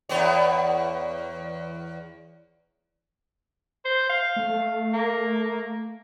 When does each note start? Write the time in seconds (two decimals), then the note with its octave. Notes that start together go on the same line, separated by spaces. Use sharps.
0.09 E2 B3 C#5
3.85 C5
4.09 F5
4.36 A3
4.93 A#3